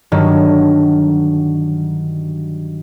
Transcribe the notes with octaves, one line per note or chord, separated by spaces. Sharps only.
G2 D3 D#3 F#3